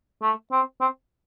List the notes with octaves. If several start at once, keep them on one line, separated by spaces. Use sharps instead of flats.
A3
C4
C4